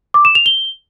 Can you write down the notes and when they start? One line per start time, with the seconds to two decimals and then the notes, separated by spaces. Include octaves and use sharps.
0.14 D6
0.25 E7
0.35 F7
0.46 G7